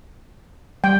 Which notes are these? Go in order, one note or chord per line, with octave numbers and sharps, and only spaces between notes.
G3 G5